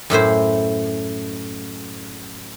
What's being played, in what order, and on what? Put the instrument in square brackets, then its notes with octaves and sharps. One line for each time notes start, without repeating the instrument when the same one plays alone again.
[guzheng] F#2 A2 E4 C5